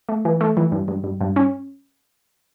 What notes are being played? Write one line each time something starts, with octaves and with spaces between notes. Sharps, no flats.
A3
E3
A3
E3
G2
G2
G2
G2
C#4